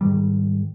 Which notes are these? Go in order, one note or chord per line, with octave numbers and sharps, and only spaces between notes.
G#2 D#3 G3